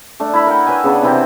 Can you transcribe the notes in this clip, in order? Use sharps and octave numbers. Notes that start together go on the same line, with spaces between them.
A3 D4
E4 B5
A#4 F#5 G5
B4 C#5 E5 G#5
C#3 B3 D4
C3 E3 C4 G5